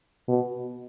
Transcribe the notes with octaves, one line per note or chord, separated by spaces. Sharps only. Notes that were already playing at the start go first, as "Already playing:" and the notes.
B2